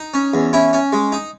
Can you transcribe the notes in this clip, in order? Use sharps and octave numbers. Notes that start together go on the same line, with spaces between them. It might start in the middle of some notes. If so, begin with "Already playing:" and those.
Already playing: D#4
C#4
E2
C#4 E4
C#4
G#3
D#4